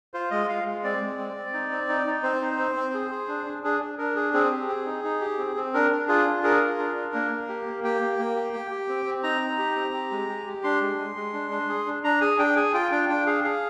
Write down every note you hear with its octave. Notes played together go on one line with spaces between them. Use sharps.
F4 C5
G#3 D#5
F4 F5
G#3
C4 D5
G#3
C4
C4
D#4
C4
D#4
D#4
C4 C5
D#4
C4
C4
G#4
G#4
D4
D4
D4 G#4
D4
D4 A#4
G#4
C4 G#4
G4
C4
D#4
D#4
G4
C4
C4
D4 A#4
D4
F4 G#4
D4
G#4 A#4
F4
D4
D4
A#3
A#3
G4
A#3
G4 G5
A#3
A#3
G4
G4
G4
C4
C4
D#4 A#5
D#4
G4
C4
G4
G#3
G4
G4
D4 C6
G#3
G#3
G#3
D4
D4
G#4
D4
D4 A#5
G#4 G#5
D4 G5
G#4 G#5
F4 G5
D4 G5
D4 G5
G#4 F5
G#4 F5